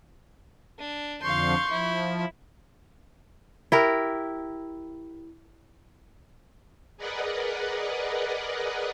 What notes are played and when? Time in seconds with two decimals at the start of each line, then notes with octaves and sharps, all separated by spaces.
0.79 D4
1.22 F2 D3 F3 F5 C6 C#6 G6
1.71 F3 E4
3.72 E4 G4 A#4
6.97 G#4 A#4 B4 D5 D#5 F#5